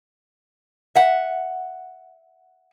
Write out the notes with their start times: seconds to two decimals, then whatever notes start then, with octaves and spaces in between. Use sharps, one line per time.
0.95 E5 F#5